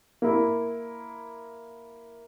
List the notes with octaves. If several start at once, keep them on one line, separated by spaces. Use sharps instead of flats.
A#3 E4